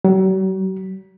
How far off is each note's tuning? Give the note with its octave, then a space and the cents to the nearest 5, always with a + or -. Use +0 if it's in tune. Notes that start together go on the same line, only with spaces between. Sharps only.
F#3 +45